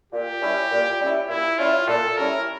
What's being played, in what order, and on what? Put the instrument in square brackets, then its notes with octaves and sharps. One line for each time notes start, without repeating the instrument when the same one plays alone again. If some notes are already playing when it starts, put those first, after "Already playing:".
[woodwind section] A#2 [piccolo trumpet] G4
[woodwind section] G3 C#4 E4
A#2
G3 C#4 E4
[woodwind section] A#2 [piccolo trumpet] E4
[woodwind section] G3 C#4 E4 [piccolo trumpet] F4
[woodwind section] A#2 [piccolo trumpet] A4
[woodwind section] G3 C#4 E4 [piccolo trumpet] A#4